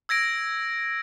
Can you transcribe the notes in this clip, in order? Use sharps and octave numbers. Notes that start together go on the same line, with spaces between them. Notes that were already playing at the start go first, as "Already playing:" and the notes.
E6 G#6 A#6 D7